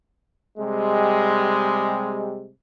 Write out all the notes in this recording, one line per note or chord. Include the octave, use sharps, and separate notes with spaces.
C3 G3 G#3